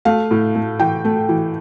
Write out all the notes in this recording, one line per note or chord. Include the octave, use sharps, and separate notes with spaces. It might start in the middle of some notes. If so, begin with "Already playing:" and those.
A3 F5
A2
A3
E3 G5
A3
E3